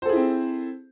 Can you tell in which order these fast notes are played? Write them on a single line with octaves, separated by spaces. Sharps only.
C5 A4 G#4 E4 C4